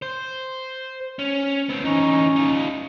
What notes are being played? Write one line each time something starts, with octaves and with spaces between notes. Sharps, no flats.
C5
C#4
B3 C4
E3 C#4 D#4
D#4 F4